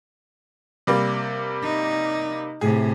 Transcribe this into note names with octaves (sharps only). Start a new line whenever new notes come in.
C3 G3 A#3
D#4
A2 C3 G#4